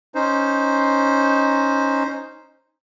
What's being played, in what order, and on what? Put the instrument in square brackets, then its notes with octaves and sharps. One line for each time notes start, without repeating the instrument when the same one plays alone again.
[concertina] C#4 D#4 C5